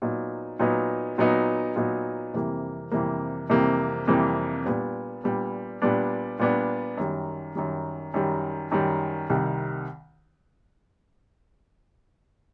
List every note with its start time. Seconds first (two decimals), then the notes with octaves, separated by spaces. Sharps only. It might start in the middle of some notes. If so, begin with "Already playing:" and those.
0.02 A#2 F#3 B3 D#4
0.59 A#2 F#3 B3 D#4
1.18 A#2 F#3 B3 D#4
1.76 A#2 F#3 B3 D#4
2.33 F2 C3 E3 G3 A#3
2.92 F2 C3 E3 G3 A#3
3.50 F2 C3 E3 G3 A#3
4.07 F2 C3 E3 G3 A#3
4.65 A#2 G3 B3 D4
5.23 A#2 G3 B3 D4
5.82 A#2 G3 B3 D4
6.39 A#2 G3 B3 D4
6.97 F#2 D#3 G3
7.55 F#2 D#3 G3
8.14 F#2 D#3 G3
8.71 F#2 D#3 G3
9.30 C2 C3 D#3 G3